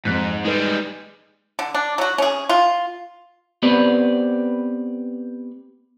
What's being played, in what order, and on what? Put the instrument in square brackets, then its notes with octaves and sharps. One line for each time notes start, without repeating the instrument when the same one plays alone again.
[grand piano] F2 F#6 B6 [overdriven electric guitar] G#2
[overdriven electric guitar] G3 G#3 [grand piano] D#4 B4
[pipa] D3
D4
F#3 F#4
C#4 G#4
F4
[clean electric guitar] B3 C4 G4 B4 D5